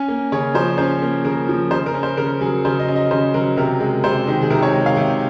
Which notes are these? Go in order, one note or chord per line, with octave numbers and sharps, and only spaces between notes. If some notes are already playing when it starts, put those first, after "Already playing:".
Already playing: C#4 G#5
A#3
C#3 C#5
F3 C5
C#4 C5
A#3
C#3 A#4
F3
C#3 C5
A#4
C#4
C5
C#3 A#4
F#3 G#4
C#3 C5
D#5
C#4
D#5
C#3 C5
F#3 A#4
C3 A#4
G#3
C3 C5
D#3
G#4
C3 A#4
C#5
G#3
F5
C3